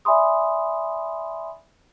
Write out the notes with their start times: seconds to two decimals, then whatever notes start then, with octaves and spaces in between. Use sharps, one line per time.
0.05 D5 E5 G#5 B5 C6 D#6